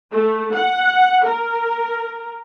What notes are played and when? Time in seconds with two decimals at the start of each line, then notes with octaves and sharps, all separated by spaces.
0.11 A3
0.54 F#5
1.25 A#4